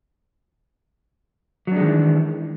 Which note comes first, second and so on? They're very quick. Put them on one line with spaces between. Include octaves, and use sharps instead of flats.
F#3 D4 G#3 D#3 E3